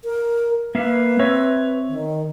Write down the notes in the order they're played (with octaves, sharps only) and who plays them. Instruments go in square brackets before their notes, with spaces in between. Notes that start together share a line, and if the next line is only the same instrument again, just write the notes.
[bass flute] A#4
[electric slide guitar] A#3 E5 F5 [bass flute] B4
[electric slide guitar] C4 C#5 E5
[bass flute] D#3